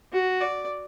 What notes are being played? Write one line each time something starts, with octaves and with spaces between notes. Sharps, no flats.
F#4
D5